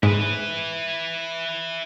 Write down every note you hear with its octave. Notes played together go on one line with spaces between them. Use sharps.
G#2 E4 B4